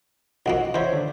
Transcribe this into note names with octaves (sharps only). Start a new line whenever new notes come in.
B1 F2 A#3 F#4 D#5 F#5
E2 C#3 C5 C#5 E5
D3